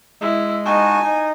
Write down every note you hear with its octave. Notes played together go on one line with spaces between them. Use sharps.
G#3 E4
D#4 F#4 G#5 A5
D#4